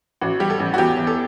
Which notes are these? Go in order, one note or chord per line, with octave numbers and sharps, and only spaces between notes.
A1 F#4
G3 G4
A4
A1
F#4
E2 G4
E2
A4